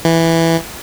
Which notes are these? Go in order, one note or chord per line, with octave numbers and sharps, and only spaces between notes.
E3